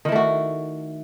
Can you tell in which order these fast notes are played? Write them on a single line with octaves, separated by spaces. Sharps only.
D#3 E4 A3 F#4